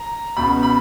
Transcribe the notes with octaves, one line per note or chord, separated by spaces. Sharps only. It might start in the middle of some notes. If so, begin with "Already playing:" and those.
Already playing: A#5
C#2 B2 B5
B5